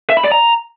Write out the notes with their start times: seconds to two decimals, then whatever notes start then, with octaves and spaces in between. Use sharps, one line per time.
0.10 E5
0.17 B5
0.24 D5
0.32 A#5